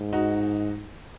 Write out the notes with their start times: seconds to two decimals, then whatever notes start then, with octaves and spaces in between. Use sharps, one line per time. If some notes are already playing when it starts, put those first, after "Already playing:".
Already playing: G#2
0.12 D#4 F#4